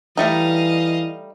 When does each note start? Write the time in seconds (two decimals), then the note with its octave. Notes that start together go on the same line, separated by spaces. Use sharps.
0.17 E3 G3 A3 D#4 D#5 F5